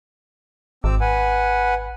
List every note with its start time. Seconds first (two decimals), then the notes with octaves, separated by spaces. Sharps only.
0.84 G#1 C4 D6 E6
1.01 B4 F#5 G#5